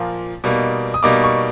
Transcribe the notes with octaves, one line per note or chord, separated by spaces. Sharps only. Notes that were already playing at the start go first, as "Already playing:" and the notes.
Already playing: A#2 F3 A#3
B2 G3 A#3 D#4
D#6
B2 G3 A#3 D#4 D6
C#6